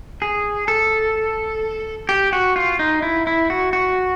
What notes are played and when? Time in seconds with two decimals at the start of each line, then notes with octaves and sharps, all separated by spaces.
0.22 G#4
0.68 A4
2.09 G4
2.33 F#4
2.56 F4
2.79 D#4
3.02 E4
3.27 E4
3.50 F#4
3.73 F#4